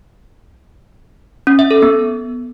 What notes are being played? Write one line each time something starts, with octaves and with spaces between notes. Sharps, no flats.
C#4
E5
A4
B3